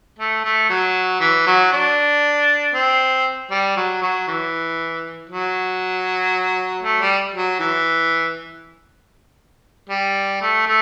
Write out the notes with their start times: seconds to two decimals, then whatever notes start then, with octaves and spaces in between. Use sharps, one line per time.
0.19 A3
0.44 A3
0.70 F#3
1.20 E3
1.46 F#3
1.72 D4
2.74 C4
3.51 G3
3.77 F#3
4.02 F#3
4.28 E3
5.29 F#3
6.83 A3
7.00 G3
7.34 F#3
7.60 E3
9.89 G3
10.41 A3
10.66 A3